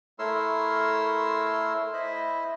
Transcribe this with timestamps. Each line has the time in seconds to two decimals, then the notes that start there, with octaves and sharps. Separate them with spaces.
0.19 A3 E4 A#4 C#5 C6 E6
1.93 E4 C5 D#5 E5 B5